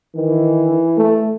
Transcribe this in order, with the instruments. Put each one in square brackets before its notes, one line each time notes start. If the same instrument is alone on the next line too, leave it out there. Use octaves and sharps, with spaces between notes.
[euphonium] D#3 [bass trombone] E3
[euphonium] A3